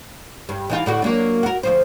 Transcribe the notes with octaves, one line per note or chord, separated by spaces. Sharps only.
G2
E3 D#4 F4
A2 D3 F#4
F#3 A#3 D4
F#4 A#4
D2 F3 C5